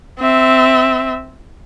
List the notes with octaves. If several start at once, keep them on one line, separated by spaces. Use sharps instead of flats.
C4 E5